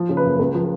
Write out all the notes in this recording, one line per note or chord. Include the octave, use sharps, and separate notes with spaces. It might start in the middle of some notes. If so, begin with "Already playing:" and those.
Already playing: F3
C#3
B4
F#1
C#2
F3